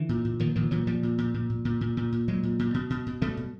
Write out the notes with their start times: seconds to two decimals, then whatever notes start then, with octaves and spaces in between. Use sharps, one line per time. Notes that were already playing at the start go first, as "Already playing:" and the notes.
Already playing: D3 E3
0.09 A#2
0.25 A#2
0.40 A#2 D#3 F3
0.55 A#2 D#3 F3
0.71 A#2 E3 F#3
0.87 A#2 F3 G3
1.03 A#2
1.18 A#2
1.34 A#2
1.50 A#2
1.65 A#2
1.81 A#2
1.97 A#2
2.12 A#2
2.28 A#2 F#3 G#3
2.43 A#2
2.59 A#2
2.74 B2
2.90 B2
3.07 B2
3.22 B2 G3 A3
3.37 B2